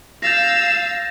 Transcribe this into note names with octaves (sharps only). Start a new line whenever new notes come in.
F5 E6 G6 A6 A#6